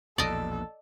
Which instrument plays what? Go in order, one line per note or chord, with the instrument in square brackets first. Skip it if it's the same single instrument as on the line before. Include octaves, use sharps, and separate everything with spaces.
[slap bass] A#1 E2 B2 [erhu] A4 [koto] D5 D#5